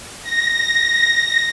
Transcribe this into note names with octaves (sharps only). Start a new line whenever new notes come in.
A#6